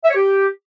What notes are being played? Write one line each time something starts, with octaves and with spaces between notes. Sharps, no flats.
E5
C#5
G4